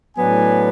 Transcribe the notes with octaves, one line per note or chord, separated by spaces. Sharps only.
A2 F#3 B3 D4 G#5